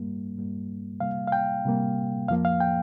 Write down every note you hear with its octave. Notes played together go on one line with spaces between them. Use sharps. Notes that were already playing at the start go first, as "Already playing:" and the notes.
Already playing: G2 G3 A#3
G2 G3 A#3
C3 G3 A#3 F5
F5
G5
C3 G3 A#3
F2 F3 A#3 F5
F5
G5